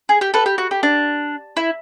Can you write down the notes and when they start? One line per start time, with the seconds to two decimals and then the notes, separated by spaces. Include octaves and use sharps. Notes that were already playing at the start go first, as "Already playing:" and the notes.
0.09 G#4
0.21 G4
0.34 A4 B4
0.46 G4
0.58 F#4
0.71 G4
0.83 D4
1.57 E4